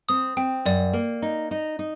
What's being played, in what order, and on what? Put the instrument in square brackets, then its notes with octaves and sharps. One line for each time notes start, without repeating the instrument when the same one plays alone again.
[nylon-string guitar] C4 [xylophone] D#6
[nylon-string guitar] C4 [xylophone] G5
[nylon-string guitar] F#2 [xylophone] D5
[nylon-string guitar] A#3
D#4
D#4
D#4